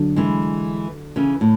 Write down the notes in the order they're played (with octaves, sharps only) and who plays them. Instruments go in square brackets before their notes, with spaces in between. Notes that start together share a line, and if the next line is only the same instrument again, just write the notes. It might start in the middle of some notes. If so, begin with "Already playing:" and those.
Already playing: [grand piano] D3 F#3 D4
[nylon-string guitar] E3 G#3
C#3 E3
A2